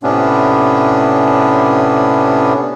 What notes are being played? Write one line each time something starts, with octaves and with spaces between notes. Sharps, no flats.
A2 C3 B3 C#4 D4